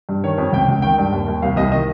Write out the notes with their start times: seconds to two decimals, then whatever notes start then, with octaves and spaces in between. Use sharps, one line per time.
0.09 G2
0.24 D#3 C#5
0.38 F2
0.52 C#2 G5
0.68 C#2
0.82 D#3 G5
0.98 G2
1.12 D#2
1.28 D#2
1.42 C2 F5
1.56 C2 D#5
1.72 D#3 D#5